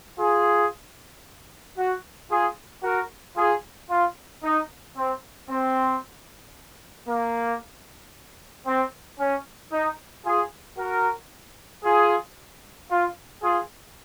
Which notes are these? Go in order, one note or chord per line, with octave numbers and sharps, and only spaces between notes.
F4 G#4
F#4
F4 G#4
F#4 A#4
F4 G#4
F4
D#4
C4
C4
A#3
C4
C#4
D#4
F4 G#4
F#4 A#4
F4 G#4
F4
F4 G#4